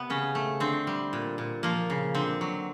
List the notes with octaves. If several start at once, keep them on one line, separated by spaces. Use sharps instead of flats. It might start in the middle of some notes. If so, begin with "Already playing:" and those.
Already playing: C3 B3
C#3 C#4
A3
D3 C4
G3
A#2
A#2
F3 A#3
C#3
D3 C4
F#3